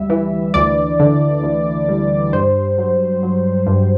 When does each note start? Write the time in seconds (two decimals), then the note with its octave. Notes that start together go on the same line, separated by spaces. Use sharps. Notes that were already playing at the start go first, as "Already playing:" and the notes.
Already playing: D2 G3 E5
0.10 E3
0.54 D2 D5
1.00 D3
1.43 D2
1.89 G3
2.33 G2 C5
2.78 F#3
3.23 F#3
3.67 G2